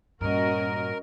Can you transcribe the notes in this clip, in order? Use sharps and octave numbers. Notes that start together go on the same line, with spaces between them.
G2 A#2 C#4 F#4 A#4 D#5